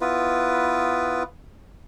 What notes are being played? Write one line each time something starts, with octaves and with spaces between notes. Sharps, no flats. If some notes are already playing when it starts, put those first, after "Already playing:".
B3 E4 F4 B4